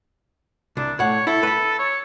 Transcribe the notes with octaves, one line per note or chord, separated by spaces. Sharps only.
C2 D4
A2 C#5 F#5
E4 A4
B4 B5
C#5